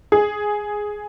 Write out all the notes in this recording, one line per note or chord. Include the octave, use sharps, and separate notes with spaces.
G#4